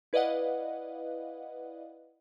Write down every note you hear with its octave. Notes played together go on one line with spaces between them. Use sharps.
E4 B4 D5 D#5 F5 F#5